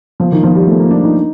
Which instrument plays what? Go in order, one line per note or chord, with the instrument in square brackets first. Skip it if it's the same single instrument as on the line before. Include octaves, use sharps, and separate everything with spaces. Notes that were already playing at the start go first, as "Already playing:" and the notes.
[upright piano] F3
D#3
F3
G3
A3
A#3
D4
D#4